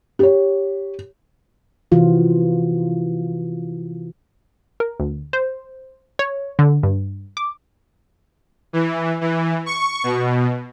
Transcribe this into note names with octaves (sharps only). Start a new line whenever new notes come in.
G4 C#5
C3 E3 F4 F#4
A#4
D2
C5
C#5
D3
G2
D6
E3
E3
C#6
B2